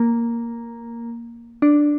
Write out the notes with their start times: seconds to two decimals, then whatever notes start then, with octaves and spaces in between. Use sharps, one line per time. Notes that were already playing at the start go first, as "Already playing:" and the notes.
Already playing: A#3
1.62 D4